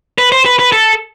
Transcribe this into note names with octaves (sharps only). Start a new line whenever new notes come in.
B4
C5
B4
B4
A4